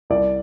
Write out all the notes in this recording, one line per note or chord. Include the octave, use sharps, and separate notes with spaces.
C2 D5